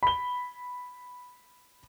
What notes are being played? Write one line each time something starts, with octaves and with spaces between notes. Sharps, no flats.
B5 G7